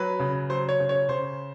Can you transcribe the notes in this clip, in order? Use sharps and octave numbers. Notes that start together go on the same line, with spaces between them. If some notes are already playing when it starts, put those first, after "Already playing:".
Already playing: F#3 B4
C#3
F#3 C5
C#5
C#3
C#5
C#3 C5